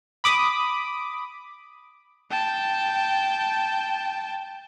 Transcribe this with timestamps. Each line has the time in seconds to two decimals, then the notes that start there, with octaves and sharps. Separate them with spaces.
0.24 B5 D6 D#6
2.31 G5 A5